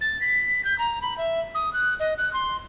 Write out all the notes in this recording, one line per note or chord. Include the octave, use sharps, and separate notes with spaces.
A6
B6
G6
A#5
B5
E5
D#6
F#6
D#5
F#6
C6